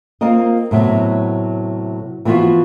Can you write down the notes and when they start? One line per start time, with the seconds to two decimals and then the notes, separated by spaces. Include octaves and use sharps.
0.21 A#3 C4 F4 A#4 D#5
0.71 A2 C3 F#3 B3
2.25 E3 F3 B3 D#4 F4 F#4